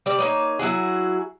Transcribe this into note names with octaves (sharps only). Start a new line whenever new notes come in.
G3 D5
A#3 D#4 C#5
F#3 E4 F#4 G#4